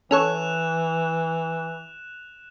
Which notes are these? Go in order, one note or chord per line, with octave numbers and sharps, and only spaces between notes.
E3 C#4 A4 C#5 F#6 E7 F7